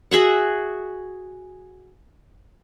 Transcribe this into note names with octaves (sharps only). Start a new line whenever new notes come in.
F#4 G#4 E5 F#5